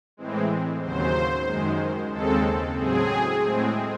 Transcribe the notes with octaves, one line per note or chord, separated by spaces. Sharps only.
A2 E3 G#3 C4
D#2 C#3 F#3 C5
F#2 D#3 G#3
D#2 C#3 G#3 C4 A4
A2 F#3 C4 G#4
A2 G#3 C4